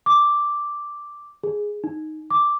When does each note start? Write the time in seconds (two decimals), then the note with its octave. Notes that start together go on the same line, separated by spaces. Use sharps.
0.06 D6
1.43 G#4
1.84 D#4
2.31 D6